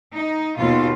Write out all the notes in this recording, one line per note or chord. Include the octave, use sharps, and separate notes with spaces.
D#4
D#2 B2 F4